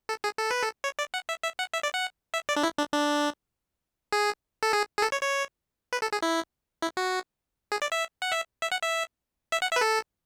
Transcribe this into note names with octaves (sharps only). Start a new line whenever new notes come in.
A4
G#4
A4
B4
A4
C#5
D5
F#5
E5
E5
F#5
E5
D5
F#5
E5
D5
D4
E4
D4
D4
G#4
A4
G#4
G#4
A4
C#5
C#5
B4
A4
G#4
E4
E4
F#4
G#4
D5
E5
F#5
E5
E5
F#5
E5
E5
F#5
E5
B4
A4